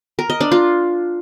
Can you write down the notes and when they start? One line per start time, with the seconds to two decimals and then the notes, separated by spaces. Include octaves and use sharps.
0.19 A#4
0.30 D#5
0.41 D4
0.52 F4